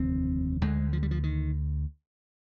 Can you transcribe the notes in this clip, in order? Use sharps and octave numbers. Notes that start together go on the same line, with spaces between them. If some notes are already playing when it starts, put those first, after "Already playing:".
Already playing: F1 D#2 D3 C4
D2 D3 G#3
F3
G3
F3
D#3